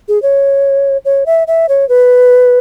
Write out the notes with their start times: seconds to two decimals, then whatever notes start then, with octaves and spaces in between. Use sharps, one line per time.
0.08 G#4
0.22 C#5
1.05 C#5
1.26 E5
1.47 E5
1.69 C#5
1.89 B4